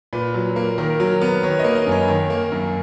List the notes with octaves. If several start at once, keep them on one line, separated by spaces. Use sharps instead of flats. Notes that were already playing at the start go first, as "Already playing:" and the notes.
A#2 B4
F#3
A#3
D#3 A#4
F#3
B3
D#3 C#5
D#5
A#3
D#5
F#2
C#5
D#3
A#3
F#2